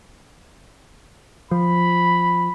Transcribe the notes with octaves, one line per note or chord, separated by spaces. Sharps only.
F3 B5